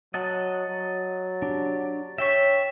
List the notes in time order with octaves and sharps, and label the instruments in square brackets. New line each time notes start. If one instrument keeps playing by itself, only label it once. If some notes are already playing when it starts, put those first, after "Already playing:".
[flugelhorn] F#3 [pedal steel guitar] D#5 F#5 A5 [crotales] A6
[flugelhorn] F#3
[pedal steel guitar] D4 G4
[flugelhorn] C#5 [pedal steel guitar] E5 G5 C#6 [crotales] B6 E7